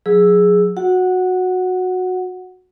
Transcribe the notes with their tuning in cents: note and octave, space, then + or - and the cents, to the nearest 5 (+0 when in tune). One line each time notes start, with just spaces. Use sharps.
F#3 -35 G#4 +0 E6 +0
F#4 -15 F#5 +0